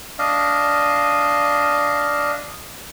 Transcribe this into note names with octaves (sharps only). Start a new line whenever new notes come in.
D4 D#5 F5